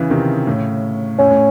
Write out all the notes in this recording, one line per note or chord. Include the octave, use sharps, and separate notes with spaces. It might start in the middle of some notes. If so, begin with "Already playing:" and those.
Already playing: C#3 E3
C3 D#3
A2 C#3
A2 C#4
A2